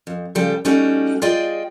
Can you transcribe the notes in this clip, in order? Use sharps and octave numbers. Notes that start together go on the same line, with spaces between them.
F2
C#3 F3 G3 A4 G5
G3 A3 C#4 D#4 F#4 G4
F4 G#4 D5 D#5 G5